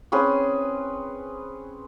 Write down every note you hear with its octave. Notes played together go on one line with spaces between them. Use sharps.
C4 C#4 G#4 B4